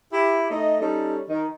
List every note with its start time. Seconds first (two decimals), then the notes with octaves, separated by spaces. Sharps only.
0.12 E4 G4
0.50 A3 D#4 D#5
0.81 G3 C#4 D#4 A4
1.29 D#3 D#4